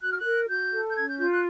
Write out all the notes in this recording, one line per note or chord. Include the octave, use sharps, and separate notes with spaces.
F#4 F#6
F6
F#6
A#4
F#4 G6
A4
G6
C#4 G#6
G6
F4 G6
F#6